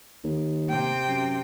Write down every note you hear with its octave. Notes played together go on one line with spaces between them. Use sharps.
D#2
C3 G5
F#2